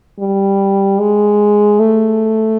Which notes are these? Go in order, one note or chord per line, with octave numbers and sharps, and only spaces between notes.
G3
G#3
A3